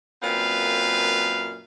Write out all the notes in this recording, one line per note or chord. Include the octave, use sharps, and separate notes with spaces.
F#2 A#2 C4 B4 F5